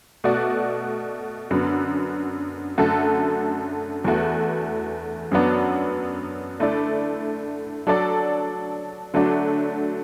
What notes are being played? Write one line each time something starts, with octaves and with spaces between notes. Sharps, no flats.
B2 A3 F#4 D5
F#2 D3 B3 F#4
F#2 D3 A3 F#4 A4
E2 E3 A3 F#4
F#2 F#3 B3 D4
D3 A3 E4 D5
F#3 D4 A4 D5
D3 F#3 A3 D4 F#4